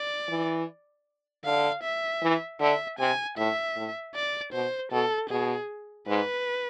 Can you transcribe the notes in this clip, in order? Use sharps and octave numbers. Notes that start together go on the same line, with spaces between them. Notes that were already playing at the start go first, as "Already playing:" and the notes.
Already playing: D5
E3
D3 F5
E5
E3
D3 E5
C3 G#5
A2 E5
A2
D5
B2 C5
B2 A4
B2 G#4
G#2 B4